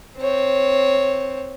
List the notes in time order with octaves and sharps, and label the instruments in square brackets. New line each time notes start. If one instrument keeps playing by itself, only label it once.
[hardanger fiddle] C4 C#5